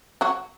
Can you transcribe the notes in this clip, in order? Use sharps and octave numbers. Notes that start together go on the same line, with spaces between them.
F#3 F#4